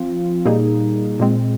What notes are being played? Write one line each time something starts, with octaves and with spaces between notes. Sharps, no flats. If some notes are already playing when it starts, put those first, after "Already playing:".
Already playing: F3 C4 F4
A#2 G3 A#3 D#4 G#4
A#2 G#3 C4